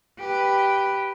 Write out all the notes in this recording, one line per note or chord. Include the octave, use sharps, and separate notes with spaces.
G4 B4